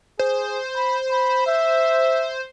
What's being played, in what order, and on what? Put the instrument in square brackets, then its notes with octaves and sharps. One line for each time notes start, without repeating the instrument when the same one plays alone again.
[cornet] G#4 [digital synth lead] C5
[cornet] B5
B5
E5